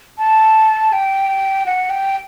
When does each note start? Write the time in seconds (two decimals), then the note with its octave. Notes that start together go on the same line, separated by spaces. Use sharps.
0.18 A5
0.93 G5
1.66 F#5
1.90 G5